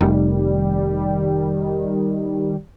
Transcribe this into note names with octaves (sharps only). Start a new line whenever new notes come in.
F1 D#3 G3